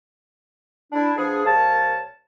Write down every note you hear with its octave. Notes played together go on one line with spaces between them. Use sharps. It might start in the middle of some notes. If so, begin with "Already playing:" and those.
D4 E4
F3 B3 D4 G#4
C2 A#3 C#5 A5